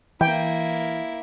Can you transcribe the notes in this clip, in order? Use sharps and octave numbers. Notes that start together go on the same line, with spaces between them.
E3 A#3 E4 G5